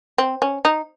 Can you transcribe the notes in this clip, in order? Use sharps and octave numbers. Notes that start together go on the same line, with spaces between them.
C4
C#4
D#4